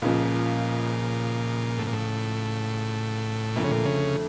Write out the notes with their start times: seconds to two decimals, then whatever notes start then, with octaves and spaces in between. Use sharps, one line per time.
0.02 C#2 A#2 C#3 F3
1.79 A2
1.87 A#2
1.93 A2
3.56 F2 A#2 D3 A3
3.64 C#3
3.71 A#2
3.85 C#3